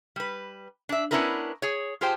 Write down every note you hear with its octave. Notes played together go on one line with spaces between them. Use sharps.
G3 B4
D4 E5
B3 C#4 D4 E4 A#4 B4
G#4 C#5
F4 G4 G#4 C5 G5 A5